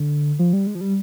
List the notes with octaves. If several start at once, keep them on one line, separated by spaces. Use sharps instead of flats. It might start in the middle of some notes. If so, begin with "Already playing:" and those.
Already playing: D3
F3
G3
G#3
F3
G3